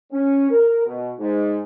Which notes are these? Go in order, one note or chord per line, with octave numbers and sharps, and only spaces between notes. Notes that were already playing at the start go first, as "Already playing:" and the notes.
C#4
A#4
B2
G#2